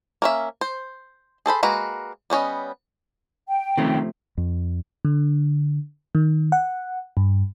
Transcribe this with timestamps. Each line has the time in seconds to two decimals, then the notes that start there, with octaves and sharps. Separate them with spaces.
0.22 A#3 C#4 E5
0.61 C5
1.46 G#4 A4 C5 B5
1.63 G#3 A#3 F#4 B4 A#5
2.30 G3 B3 C#4 D#5
3.48 G5
3.78 C3 D#3 F3 A3 C4 C#4
4.37 F2
5.05 D3
6.15 D#3
6.52 F#5
7.17 G2